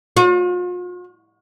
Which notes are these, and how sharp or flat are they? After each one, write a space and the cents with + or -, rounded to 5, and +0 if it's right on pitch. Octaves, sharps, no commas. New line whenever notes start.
F4 +45